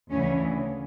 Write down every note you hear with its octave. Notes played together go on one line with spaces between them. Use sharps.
D2 C#3 E3 C#4